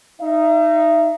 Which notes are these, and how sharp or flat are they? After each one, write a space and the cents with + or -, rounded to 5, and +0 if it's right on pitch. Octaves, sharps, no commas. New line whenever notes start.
D#4 +0 E5 +35